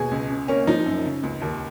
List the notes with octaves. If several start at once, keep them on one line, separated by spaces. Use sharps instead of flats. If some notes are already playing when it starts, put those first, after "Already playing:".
Already playing: D#2 B2 G#4
C#2
C#3
A#3 C#4
F3 D#4
F#2
C#3
C#2
D#2